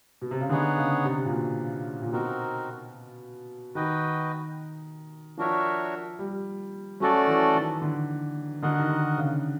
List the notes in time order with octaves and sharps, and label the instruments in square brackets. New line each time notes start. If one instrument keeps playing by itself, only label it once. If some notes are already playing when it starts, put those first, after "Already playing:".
[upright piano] B2
C3
C#3
[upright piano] D3 [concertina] B3 D#4 G#4 C#5 F#5
[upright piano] C#3
C3
A#2
B2
A#2
[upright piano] B2 [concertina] C4 D#4 F#4 A#4
[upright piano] D#3 [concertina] F#4 B4 D#5 G5
[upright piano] F3 [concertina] D4 F#4 A#4 C#5 E5
[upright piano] G3
[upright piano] F#3 [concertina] A3 C#4 F#4 A4 D5
[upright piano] E3
D#3
D3
[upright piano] D3 [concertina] F#4 A#4 D#5 F#5
[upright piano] D#3
D3
C#3